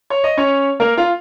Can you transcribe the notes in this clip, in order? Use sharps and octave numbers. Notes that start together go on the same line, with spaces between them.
C#5
D#5
C#4 C#5
A#3 A#4
F4